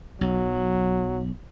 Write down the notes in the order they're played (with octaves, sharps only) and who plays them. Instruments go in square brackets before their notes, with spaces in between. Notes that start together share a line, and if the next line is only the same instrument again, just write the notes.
[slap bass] B1 [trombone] F#3